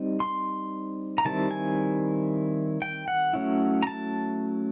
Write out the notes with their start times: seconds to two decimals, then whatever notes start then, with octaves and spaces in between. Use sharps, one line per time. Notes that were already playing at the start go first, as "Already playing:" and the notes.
Already playing: G3 C4 D#4
0.20 C6
1.18 A#5
1.25 D#3 G3 C4 E4 A5
1.51 G#5
2.82 G5
3.08 F#5
3.33 F#3 A3 C#4 E4
3.83 A#5
3.87 A5